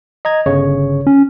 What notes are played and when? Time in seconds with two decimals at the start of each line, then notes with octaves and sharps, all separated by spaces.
0.25 D#5 A#5 G#6
0.46 G1 C#3 C#5
1.07 C#4